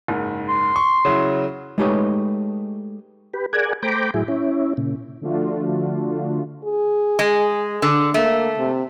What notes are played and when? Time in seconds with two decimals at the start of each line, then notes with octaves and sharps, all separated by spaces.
0.08 F#1 G#2
0.49 C6
0.76 C#6
1.05 C#3 F#3 E4
1.78 G#3 A3 D#4 G4 B4 C#5
3.34 G4 B4
3.53 G#4 A#4 D5 F#5 G#5
3.83 A3 C5 G5 A#5 B5 D6
4.14 A2 F#3 E4 G#4
4.28 C#4 E4
4.77 A#2 C#3
5.21 D3 F3 A3 D4 F4 F#4
6.64 G#4
7.19 G#3
7.82 D3
8.14 A3 A#3
8.59 C3